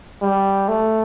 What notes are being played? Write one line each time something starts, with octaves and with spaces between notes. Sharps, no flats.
G3
A3